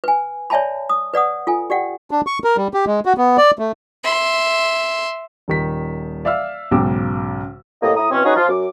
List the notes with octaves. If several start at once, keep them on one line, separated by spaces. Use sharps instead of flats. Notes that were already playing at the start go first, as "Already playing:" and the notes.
B4 G#5
C#5 D5 E5 G#5 A5 B5
D#6
B4 D5 F#5 D#6
F4 A4 G#5
G4 D5 F#5 G5
D4
C#6
A#4
G3
G4
G#3
F#4
B3
D5
A3
E5 C6
D#1 D#3 B6
D5 E5 F5 E6 F6
B1 G#2 C#3 G5 D6 E6
C2 A2 A#3 D#5
A2 E4 A#5 D#6
B2 E3 C4 C#4
C#4 D#4 F#4 G#4 B4 C#5
F3 F4
F#2 D6